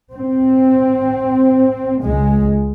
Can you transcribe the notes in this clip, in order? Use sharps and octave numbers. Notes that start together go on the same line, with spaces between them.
C4
C#2 G#3